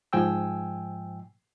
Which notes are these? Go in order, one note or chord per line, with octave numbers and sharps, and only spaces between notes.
G#2 F3 G5 G#5 E6